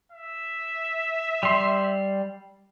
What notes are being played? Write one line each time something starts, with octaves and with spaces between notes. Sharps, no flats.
E5
G3 C6